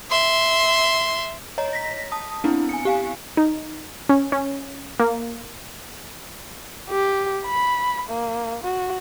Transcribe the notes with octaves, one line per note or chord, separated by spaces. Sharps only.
E5 C6
C#5 D#5 A#5
A#6 B6
A5 D#6
B3 C4 D4 E4
G#5 C#7
G4 F5 G#5
D#4
C#4
C#4
A#3
G4
B5
A#3
F#4